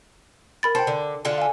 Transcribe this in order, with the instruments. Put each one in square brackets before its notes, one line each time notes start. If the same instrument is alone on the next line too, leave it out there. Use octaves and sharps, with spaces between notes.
[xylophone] A#4 B5 A6
[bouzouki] C5 F#5 [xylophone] G5 A5
[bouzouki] D3
D3 F4 A4
[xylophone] F5 G#5